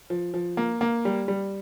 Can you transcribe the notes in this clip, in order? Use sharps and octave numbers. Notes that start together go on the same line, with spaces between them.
F3
F3
A#3
A#3
G3
G3